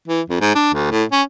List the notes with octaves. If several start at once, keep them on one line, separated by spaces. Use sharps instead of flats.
E3
F2
G#2
D4
D2
A2
C#4